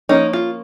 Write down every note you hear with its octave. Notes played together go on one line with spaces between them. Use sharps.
F3 A#3 C#4 D#4
F4